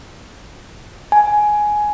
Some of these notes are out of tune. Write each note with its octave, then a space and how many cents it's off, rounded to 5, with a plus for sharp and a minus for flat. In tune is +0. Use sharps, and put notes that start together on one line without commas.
G#5 +10